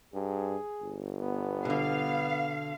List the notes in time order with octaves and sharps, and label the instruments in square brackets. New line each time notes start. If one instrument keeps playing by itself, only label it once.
[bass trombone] G2 [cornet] G#4
[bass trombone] G1
[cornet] B3
[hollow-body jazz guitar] B2 D3 [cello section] F5